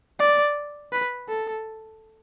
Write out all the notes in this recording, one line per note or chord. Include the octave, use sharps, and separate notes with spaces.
D5
B4
A4